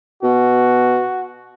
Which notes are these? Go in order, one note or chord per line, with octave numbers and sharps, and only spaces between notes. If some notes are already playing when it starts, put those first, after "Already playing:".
B2 F#4